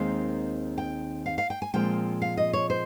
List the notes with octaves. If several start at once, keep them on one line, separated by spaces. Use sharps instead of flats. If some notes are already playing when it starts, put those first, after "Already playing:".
Already playing: D#2 D#3 G#3 C4 F5
G5
F5
F5
G5
G#5
A#2 F3 G#3 C4 F4 G5
F5
D#5
C#5
C5